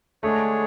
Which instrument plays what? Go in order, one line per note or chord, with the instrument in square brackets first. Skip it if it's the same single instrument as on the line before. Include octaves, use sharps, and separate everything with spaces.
[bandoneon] D3 G#3 D4 G#4 C#5 [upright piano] A3